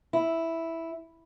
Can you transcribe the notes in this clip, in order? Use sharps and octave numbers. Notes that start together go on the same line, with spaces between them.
E4